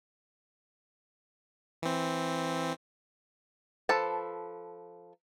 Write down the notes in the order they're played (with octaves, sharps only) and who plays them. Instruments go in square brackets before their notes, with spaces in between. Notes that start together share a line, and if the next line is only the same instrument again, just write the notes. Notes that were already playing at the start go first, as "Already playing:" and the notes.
[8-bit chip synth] E3 C4
[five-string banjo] F3 A4 B4 A5